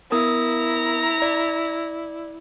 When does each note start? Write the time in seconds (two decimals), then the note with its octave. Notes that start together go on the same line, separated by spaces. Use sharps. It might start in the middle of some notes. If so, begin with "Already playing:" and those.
0.12 B3 E4 A#4 A#5 D#6
1.22 D5